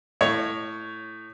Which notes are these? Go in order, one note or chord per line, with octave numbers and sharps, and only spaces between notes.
A2 C#5 C#6